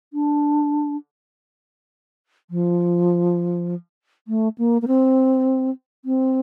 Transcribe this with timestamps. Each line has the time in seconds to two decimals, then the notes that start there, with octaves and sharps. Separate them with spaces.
0.13 D4
2.50 F3
4.28 A3
4.58 A#3
4.82 A#3
4.87 C4
6.05 C4